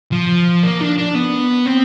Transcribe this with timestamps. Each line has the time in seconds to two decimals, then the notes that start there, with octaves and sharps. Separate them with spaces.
0.12 F3
0.63 A#3
0.81 D4
0.98 D4
1.15 B3
1.66 C4